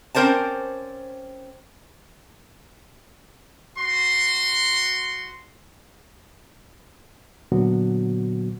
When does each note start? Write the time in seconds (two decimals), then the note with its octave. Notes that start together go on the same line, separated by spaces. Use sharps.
0.15 C4 C#4 A#4 C5 D5 A5
3.78 F#4 C6
7.52 A#2 D3 F#3 B3 F#4